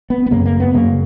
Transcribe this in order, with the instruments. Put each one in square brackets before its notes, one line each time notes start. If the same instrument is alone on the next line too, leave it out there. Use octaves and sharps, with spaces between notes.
[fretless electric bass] B3
B3
F#2 C#3 A#3
A#3
B3
F#2 C#3 A#3